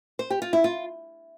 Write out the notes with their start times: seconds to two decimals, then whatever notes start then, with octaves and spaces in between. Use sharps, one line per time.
0.19 C5
0.30 G4
0.42 F4
0.53 E4
0.64 F4